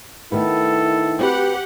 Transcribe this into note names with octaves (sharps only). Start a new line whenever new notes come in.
D#3 A3 B3 E4 A4
C4 F#4 G4 B4 F#5